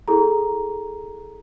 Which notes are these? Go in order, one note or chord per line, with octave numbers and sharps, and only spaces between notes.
E4 G#4 A4 A#5